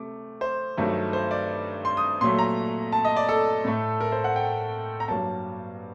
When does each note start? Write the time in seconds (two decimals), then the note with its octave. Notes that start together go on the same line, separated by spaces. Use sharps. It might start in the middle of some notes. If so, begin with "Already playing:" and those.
Already playing: C3 A3 D6
0.41 C5
0.77 G2 D#3 F#3 A3
1.13 C5
1.31 D5
1.85 C6
1.97 D#6
2.21 A#2 F#3 A3 C6
2.39 A#5
2.92 A5
3.05 D#5
3.16 D5
3.29 A4
3.65 A2 A3
4.00 A#4
4.12 C5
4.24 F#5
4.36 G5
5.00 A#5
5.08 G2 F#3 A#3 A5